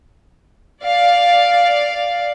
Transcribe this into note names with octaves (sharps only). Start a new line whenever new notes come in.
D5 F5